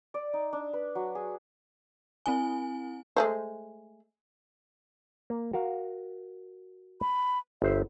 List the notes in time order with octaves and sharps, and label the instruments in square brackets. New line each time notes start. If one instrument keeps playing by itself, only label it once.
[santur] D5
D#4
D4
B4
F#3
G#4
[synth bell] C4 E4 G#5
[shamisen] G#3 A3 C5
[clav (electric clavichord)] A#3
F#4 A#4 F5
[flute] B5
[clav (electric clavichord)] G1 C5 [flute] E5